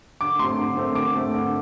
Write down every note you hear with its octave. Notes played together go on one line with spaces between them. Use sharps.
D3 D6
A3 C4 C6
D3
A3 C4
D3 D6
A3 C4
D3